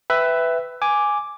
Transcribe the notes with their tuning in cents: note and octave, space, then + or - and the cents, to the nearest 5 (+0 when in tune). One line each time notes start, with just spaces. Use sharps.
B4 +15 E5 +0 G5 +0
G#5 +0 D6 +0